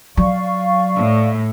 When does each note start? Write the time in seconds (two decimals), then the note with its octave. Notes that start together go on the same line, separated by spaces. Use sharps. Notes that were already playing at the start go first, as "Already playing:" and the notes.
0.17 F#3 D5 F5 C#6
0.96 A2